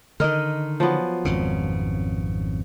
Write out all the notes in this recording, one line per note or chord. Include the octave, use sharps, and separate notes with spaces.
D3 D#3 A#4 D#5
F3 F#3 B3
G#1 F2 C#3